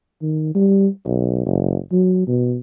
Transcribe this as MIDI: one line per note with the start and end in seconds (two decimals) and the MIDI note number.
0.22 0.53 51
0.55 0.88 55
1.05 1.45 35
1.46 1.78 30
1.92 2.27 54
2.28 2.58 47